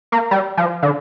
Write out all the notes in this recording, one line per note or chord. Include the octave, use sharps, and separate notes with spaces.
A#3
G3
F3
D3